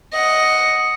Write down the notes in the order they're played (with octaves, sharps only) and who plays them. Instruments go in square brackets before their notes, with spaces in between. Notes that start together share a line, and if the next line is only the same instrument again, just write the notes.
[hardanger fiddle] D#5 F#5